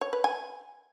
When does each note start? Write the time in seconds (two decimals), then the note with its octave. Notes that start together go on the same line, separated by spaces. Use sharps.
0.01 C#5
0.13 B4
0.24 G#5